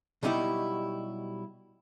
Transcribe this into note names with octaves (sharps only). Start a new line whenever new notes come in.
B2 F#3 G3 D#4 E4 G4